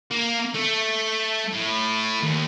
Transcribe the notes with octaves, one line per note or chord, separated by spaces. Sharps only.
A#3
A3
A2
D#2